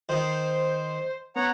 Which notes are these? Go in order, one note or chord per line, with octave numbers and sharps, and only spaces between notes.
D#3 D#4 C5
B3 C#5 F#5 A#5